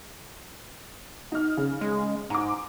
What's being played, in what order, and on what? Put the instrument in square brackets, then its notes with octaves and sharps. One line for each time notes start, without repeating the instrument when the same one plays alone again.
[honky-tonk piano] D#4 F6
C#3
[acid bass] G#3
[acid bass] G#2 [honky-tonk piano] A#5 D6